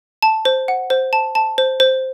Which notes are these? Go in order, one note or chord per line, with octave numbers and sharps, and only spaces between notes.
A5
C5
F#5
C5
A5
A5
C5
C5